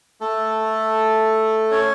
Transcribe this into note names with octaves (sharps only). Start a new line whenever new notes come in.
A3 A4
C#4 C#5